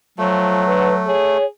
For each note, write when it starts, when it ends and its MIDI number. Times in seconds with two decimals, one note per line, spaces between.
0.18 0.62 53
0.18 1.13 54
0.18 1.38 57
0.67 0.91 50
0.67 0.93 71
1.07 1.47 68
1.07 1.45 73